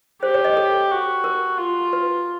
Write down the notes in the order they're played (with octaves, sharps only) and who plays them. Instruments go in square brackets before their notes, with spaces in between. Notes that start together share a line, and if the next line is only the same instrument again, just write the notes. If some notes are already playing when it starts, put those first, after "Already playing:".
[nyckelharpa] G4 [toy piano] C5
[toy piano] C#5
D#5
A4
[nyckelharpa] F#4
[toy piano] A#4
[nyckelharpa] F4
[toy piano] B4